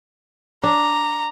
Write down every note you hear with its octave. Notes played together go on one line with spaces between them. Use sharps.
D4 A#5